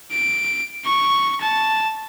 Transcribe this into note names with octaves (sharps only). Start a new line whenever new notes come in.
D7
C#6
A5